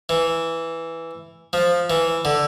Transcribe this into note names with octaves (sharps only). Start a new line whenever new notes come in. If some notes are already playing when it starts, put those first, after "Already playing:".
E3
F3
E3
D3